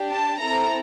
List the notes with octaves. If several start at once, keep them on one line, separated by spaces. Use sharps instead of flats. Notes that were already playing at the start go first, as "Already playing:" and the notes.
Already playing: D4 G4
A5
C4 E4 A4 A#5